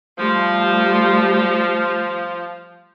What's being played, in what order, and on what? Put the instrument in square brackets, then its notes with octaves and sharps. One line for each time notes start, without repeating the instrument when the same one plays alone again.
[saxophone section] F3 [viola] G3 A3